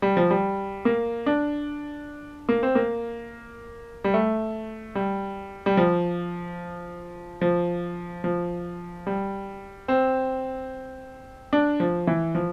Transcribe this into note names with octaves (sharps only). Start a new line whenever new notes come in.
G3
F3
G3
A#3
D4
A#3
C4
A#3
G3
A3
G3
G3
F3
F3
F3
G3
C4
D4
F3
E3
F3